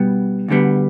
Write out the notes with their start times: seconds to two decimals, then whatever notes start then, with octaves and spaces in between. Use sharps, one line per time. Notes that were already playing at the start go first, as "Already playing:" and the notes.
Already playing: B2 G3 B3
0.48 D2 D3 G3 B3